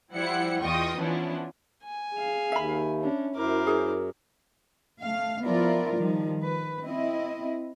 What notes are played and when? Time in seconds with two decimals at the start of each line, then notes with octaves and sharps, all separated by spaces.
0.12 F3 G3 E4 C5 F#5 C#7
0.60 E2 F4 D#5 G5 C#6 D#6
0.98 E3 F3 B3 C#4 D4 E4
1.83 G#5
2.14 G#4 F5
2.52 D#2 E5 B5
3.02 C#4 D4
3.35 F#2 E4 A#4 C5 D6
3.67 G#4
5.01 A3 F5
5.43 F3 B3 E4 F4 A#4 D5
5.96 D#3 F3 G3
6.40 B4
6.83 C4 E4 D#5